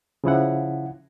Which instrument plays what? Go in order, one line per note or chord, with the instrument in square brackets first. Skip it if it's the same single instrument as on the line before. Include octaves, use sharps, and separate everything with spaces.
[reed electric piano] C#3 F3 E4 F#5